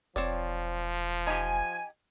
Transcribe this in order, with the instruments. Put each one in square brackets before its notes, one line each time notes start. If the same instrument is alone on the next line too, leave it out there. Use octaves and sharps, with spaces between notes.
[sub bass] E1 [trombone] F3 [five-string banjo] C4 C#5 D5
[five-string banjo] D#4 G4 [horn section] G#5